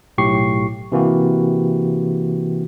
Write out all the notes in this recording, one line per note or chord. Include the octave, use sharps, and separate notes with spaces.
B1 A2 G4 C#6 C7
C3 E3 A#3 F#4 G4